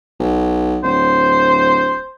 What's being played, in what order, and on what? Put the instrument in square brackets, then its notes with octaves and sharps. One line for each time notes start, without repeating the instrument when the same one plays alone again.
[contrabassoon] B1
[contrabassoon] D1 [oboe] C5